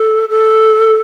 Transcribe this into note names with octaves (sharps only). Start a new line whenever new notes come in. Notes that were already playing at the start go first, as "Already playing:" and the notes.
Already playing: A4
A4